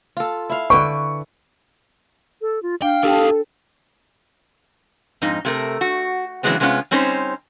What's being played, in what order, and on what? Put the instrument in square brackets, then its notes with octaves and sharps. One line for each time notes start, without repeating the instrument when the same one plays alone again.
[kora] F4 A4
E4 F5
[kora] D3 B4 G5 [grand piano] C#6
[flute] A4
F4
[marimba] D4 [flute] F5 [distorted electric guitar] G5
[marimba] D4 G5 [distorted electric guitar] G4 A#4 [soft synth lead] A4
[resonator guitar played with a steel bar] F2 G#2 D#4
C3 A3 A#4
F#4
C#3 E3 F#3 G#3 B3 C4
C3 G#3 B3 C#4 F4
G3 C4 C#4 D#4 C5